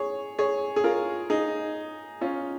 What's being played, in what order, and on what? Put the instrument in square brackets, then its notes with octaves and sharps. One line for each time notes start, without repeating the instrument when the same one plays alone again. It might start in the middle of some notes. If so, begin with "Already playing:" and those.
Already playing: [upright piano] G#4 C#5
G#4 C#5
G#4
F4 A#4
D#4 G#4
C#4 F4